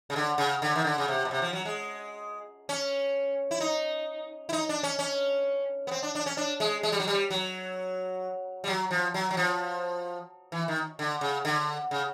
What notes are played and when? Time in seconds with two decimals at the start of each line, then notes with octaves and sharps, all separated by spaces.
0.10 C#3
0.16 D3
0.38 C#3
0.62 D3
0.76 D#3
0.84 D3
0.98 C#3
1.08 C3
1.25 B2
1.31 C3
1.42 F3
1.53 F#3
1.65 G#3
2.69 C#4
3.51 E4
3.60 D#4
4.49 E4
4.53 D#4
4.69 D4
4.83 C#4
4.99 C#4
5.87 B3
5.91 C4
6.03 D4
6.15 D4
6.26 C#4
6.37 D4
6.60 G#3
6.83 G#3
6.92 G3
7.00 F#3
7.08 G3
7.30 F#3
8.64 G3
8.68 F#3
8.91 F3
9.14 F#3
9.31 F#3
9.37 F3
10.52 E3
10.68 D#3
10.99 D3
11.21 C#3
11.45 D3
11.91 C#3